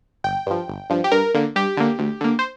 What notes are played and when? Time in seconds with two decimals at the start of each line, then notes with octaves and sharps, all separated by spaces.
0.24 G1 G5
0.46 G2 F3
0.68 G1
0.90 G2 F3
1.04 G4
1.11 G2 A#4
1.34 D3 A#3
1.56 G2 G4
1.77 D3 A#3
1.99 D2
2.21 D3 A#3
2.39 C5